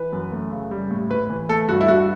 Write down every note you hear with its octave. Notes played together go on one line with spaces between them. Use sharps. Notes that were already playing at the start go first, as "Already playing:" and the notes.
Already playing: E3 B4
F#2
A3
C#3
G3
A2
A2 B4
E3
A3 A4
G2 F#4
E4
G2 F#4